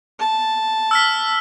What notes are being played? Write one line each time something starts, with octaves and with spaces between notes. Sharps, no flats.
A5
E6 F6 B6